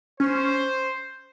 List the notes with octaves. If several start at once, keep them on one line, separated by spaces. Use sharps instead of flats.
C#4 C5